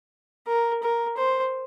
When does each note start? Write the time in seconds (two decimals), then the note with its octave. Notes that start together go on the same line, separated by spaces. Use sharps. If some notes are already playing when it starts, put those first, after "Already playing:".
0.47 A#4
0.82 A#4
1.17 C5